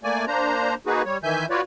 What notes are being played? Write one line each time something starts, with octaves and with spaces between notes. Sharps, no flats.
A3 A#3 D5 G#5
A#3 D4 C5 A#5
A#3 D#4 F#4 G#4 B4
G3 C#5
D#3 E3 E5 G#5 G6
F4 F#4 B4 C#5 D5